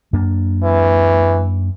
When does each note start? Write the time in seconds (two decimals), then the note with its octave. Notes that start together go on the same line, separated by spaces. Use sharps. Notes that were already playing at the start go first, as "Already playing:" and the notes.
0.13 F#2 A#3 D4
0.63 E3